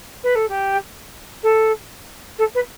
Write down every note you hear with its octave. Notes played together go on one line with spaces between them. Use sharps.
B4
A4
G4
A4
A4
B4